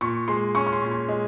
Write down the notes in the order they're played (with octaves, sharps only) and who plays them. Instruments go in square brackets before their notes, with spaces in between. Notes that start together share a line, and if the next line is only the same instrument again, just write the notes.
[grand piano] A#2 [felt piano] C#6
[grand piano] G#3 [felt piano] C6
[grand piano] C#4 [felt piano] C#6
[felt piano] C#6
C6
[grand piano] A#2
[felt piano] C6
[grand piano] G#3 [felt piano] D#5